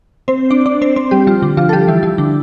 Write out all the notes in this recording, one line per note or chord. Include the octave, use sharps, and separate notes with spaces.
C4 C5
D4 D5
D4 D5
C4 C5
C4 C5
G3 G4
F3 F4
D3 D4
F3 F4
A4
G3 G4
E3 E4
E3 E4
D3 D4